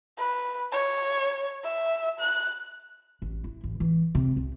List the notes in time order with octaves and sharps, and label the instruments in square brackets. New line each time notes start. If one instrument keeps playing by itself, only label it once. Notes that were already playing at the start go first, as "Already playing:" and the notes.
[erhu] B4
C#5
E5
F#6
[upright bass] A1
E4
A1
E3
C3
C2